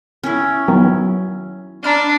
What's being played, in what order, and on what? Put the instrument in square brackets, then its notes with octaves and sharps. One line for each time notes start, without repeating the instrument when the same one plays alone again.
[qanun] C#4 E4
[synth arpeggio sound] D#3 B3 [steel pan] F#3
[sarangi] D4 [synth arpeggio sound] A#5 B5 F6